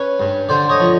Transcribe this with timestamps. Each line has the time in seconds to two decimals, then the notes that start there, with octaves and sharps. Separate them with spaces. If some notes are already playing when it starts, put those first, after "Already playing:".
Already playing: C#4 B4 C#5
0.20 G2
0.49 D3 C5 D5
0.69 C#5 D#5
0.80 F3